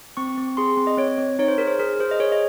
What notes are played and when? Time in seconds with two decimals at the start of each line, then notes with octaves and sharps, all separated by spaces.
0.17 C4 C#6
0.37 C4
0.57 G#4 C6
0.77 C4
0.87 D#5
0.98 C4 C#5
1.18 C4
1.39 D#4 C#5
1.48 C5
1.58 G#4 A#4
1.67 C5
1.79 G#4 A#4
2.00 G#4 C5
2.11 D#5
2.20 G#4 C#5
2.32 D#5